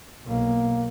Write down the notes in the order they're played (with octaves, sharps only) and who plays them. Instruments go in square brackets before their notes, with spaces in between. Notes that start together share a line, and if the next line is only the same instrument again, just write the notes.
[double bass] B1 [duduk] A#3